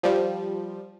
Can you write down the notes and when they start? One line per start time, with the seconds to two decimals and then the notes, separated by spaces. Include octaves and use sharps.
0.03 F3 G3